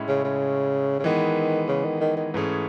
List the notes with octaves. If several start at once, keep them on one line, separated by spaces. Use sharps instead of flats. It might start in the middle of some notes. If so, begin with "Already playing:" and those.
Already playing: A2 G#3 C#4 E4
C#3
C#3
C#3
D#3 E3 G#3 B3
C#3
D#3
D#3
D#3
G#2 E3 A3 C#4 G#4